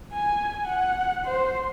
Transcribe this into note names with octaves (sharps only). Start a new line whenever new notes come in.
G#5
F#5
C5